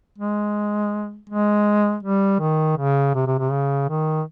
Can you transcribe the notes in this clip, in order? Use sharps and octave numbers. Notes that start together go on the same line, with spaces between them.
G#3
G#3
G3
D#3
C#3
C3
C3
C3
C#3
D#3